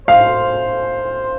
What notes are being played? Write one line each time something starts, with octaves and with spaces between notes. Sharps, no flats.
C5 F5